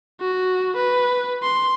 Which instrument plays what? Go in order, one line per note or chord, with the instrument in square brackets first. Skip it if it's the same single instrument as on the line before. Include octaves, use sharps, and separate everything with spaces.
[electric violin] F#4
B4
C6